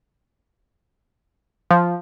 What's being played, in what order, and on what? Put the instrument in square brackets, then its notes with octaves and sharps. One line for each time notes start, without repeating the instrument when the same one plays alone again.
[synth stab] F3